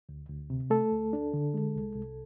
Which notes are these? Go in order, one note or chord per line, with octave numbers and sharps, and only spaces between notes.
D2
D2
C3
A3 A4
D2
D4
D3
G#3
C2
C2